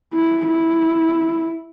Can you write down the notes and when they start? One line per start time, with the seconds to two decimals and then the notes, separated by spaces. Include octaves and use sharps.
0.13 E4
0.48 E4